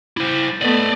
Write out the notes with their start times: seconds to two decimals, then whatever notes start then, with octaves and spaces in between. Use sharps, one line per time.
0.17 E4 C5
0.62 A3 B3 D5 D#5